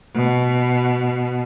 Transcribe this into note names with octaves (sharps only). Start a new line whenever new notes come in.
B2